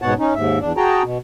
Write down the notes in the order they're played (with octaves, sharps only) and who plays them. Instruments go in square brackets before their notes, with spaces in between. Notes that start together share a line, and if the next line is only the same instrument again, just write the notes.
[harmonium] G#2 B2 B3 C#5 F#5 A5
C#4 D#4
D#2 G#2 E5
E2 D4
F#4 G#4 G5 A5 A#5
B2